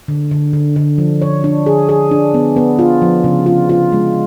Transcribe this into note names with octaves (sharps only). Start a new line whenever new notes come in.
D3
D3
D3
D3
F3
C#5
D4
G#4
G#4
D4
B3
B3
F4
F3
C#3
F4
F4
G#3